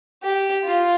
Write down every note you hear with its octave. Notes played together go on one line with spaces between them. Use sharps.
G4
F4